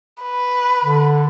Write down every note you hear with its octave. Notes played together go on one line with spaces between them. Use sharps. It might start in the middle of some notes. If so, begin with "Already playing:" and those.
B4
D3